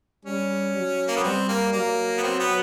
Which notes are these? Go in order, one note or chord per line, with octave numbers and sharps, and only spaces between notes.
G3 C#4
F#3
A#3
B3
G3 C4
A#3
F#3 A#3
B3
C4
B3